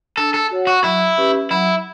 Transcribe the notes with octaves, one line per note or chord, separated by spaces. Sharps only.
D4 A4
A4
F#4 C#5 F#5
F#4
F#3 E4
C#4 G4 B4 E5
F#3 E4